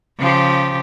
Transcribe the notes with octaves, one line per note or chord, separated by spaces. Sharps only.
C#3 F3 G4